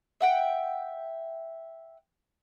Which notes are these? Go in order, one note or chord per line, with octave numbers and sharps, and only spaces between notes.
E5 F#5 G5